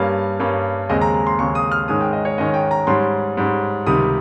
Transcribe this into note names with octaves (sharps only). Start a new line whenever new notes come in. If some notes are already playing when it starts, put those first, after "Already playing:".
Already playing: G2 G3 A#3 C#4 F5
G2 G3 A#3 C#4
D#2 C#3 G#3 C4 D#5
A#5
A#5
C6
D#2 C#3 G#3 C4 C#6
D#6
F6
G#2 D#3 G#3 C#4 D#6
G5
D#5
C#5
G#2 D#3 G#3 C#4 D#5
G5
A#5
G#2 G3 C#4 C6
G#2 G3 C#4
C#2 C3 D#3 G3 D#6